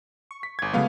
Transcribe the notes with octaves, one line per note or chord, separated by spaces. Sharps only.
C#6
B6
G1 G#6
C#3 F#3 G#3 A3 B3 F5